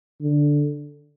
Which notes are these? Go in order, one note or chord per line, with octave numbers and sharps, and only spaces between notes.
D3